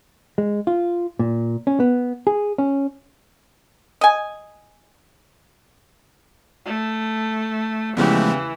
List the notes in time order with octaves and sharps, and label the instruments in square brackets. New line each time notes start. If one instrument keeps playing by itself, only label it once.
[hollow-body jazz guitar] G#3
F4
A#2
C#4
B3
G#4
C#4
[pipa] D#5 G#5
[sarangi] A3
[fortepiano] E2 C#3 G4 [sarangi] E3 [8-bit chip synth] F3 G#3 A3